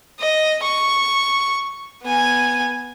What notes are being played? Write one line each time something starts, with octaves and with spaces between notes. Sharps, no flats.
D#5
C#6
B3 G#5